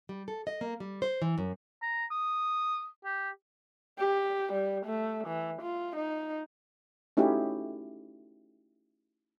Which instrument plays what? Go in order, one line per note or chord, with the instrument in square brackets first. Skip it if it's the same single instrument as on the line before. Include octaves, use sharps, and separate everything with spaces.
[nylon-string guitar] G3
A4
D#5
A#3
G3
C5
E3
F#2
[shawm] A#5
D#6
G4
[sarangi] G4
G3
A3
E3
F4
D#4
[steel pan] A3 C#4 D#4 E4 F#4 G4